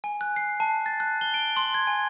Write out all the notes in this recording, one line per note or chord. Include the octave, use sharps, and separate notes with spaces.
G#5
F#6
C7
A5
A6
F#6
G7
D7
C6
G#6
G#5